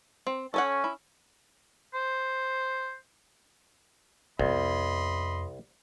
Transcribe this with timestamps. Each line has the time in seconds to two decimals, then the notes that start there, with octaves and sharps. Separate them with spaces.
0.27 C4
0.54 C#4 A4 C#5 F#5
0.84 E4
1.93 C5
4.39 C2 F2 B3 D#5 B5 C6